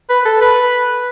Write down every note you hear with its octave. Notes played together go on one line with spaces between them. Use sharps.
B4
A4
B4